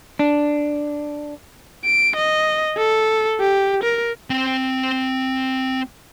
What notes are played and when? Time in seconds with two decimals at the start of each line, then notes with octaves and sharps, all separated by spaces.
0.19 D4
1.85 D7
2.16 D#5
2.77 A4
3.40 G4
3.84 A#4
4.30 C4 G5